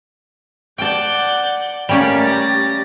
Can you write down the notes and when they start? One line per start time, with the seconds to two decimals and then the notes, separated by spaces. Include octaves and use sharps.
0.78 D5 F#5 G5 A5 G6
1.89 G3 A3 A#3 C#4 G4 D5
2.21 A6 A#6